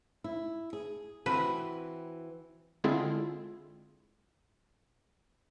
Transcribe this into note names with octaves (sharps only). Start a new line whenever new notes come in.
E4
G#4
E3 C4 F#4 B4
D3 G#3 C4 E4 F4 G#4